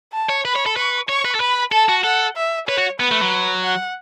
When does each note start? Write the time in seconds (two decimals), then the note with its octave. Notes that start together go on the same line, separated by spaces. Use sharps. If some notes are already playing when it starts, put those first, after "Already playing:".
0.13 A5
0.29 C#5
0.45 B4 B5
0.56 C#5
0.66 A4
0.76 B4 C#6
1.09 C#5 C#6
1.25 B4
1.35 A4
1.40 B4 B5
1.72 A4 A5
1.89 F#4
2.04 A4 F#5
2.36 E5
2.68 B4 C#5
2.78 F#4
3.00 B3 B4
3.11 A3
3.21 F#3
3.64 F#5